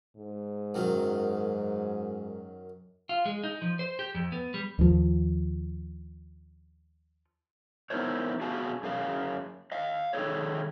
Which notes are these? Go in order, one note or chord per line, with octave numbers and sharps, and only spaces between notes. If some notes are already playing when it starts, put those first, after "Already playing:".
G#2
F#2 D#3 F#3
F4
G#3
D#4
F3
C5
G4
F2
B3
G3
D#2 F3
B3 D#4 E4 A#4 C5 C#5
B3 F#4 G#4 F5 G#5 A5
F#2 G#4 F5
D#5 F5
D#3 G3 B3 G#4 A4 C#5